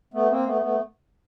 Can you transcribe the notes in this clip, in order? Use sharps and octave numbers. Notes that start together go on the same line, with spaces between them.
A3 B3
A#3 C4
A3 B3
A3 B3